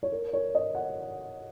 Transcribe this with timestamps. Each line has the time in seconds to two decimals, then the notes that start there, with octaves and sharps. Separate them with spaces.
0.03 C#5
0.12 A#4
0.33 C#5
0.55 D#5
0.75 F#5